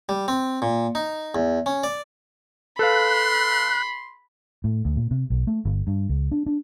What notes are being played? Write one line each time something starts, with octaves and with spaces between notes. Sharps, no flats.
G3
C4
A#2
D#4
E2
C#4
D5
A4 B4 F5 B5 C6 F#6
A2
D2
A#2
C3
B1
A3
G1
G2
C#2
D4
D4